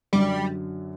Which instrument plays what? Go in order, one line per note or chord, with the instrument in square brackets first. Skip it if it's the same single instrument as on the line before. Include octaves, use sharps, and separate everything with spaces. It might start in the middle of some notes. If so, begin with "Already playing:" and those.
[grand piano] F#2 D3 F#3 [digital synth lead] G3